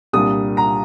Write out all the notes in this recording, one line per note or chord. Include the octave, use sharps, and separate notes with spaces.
C2 A#2 G3 A#3 D4 D#6
A#5